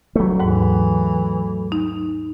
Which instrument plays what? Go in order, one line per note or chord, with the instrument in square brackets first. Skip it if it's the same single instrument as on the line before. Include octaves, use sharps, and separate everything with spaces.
[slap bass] F#3 A3
[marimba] D#2 G#2 [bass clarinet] E3
[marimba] D#4